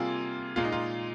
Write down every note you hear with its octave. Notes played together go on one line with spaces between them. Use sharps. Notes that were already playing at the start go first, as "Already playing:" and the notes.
Already playing: C3 G3 A#3 F4 G#4
A#2 G#3 F4
D#4
F4